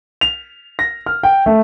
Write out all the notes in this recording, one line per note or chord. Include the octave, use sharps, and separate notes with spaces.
F7
A#6
F6
G5
A3